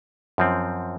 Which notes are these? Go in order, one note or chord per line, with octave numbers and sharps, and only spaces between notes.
F#2 F3 C4